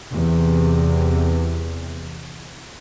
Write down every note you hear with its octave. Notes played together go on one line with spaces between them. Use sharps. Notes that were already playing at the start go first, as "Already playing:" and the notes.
E2 C3